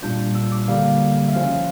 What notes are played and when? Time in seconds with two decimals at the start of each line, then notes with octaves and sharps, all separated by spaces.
0.03 A#2 G3 D4 F4 G6
0.35 E6
0.52 D6
0.68 D3 G3 A#3 F5
1.28 E5
1.33 C#3 F3 C#4 F4 F5